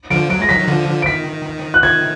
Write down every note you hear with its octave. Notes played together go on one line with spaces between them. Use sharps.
D3 F3 D7
F#3 D7
G#3 A#6
D#3 F#3 B6
F#3
D3 F3
D7
D#3 B6
F#6
D#3 G#6